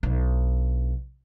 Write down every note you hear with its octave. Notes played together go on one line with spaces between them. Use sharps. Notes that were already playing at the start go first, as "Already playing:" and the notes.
B1 D4